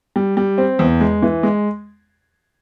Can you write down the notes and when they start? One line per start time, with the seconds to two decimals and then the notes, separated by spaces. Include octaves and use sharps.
0.16 G3
0.37 G3
0.58 C4
0.79 E2
1.01 G#3
1.22 E3
1.43 G#3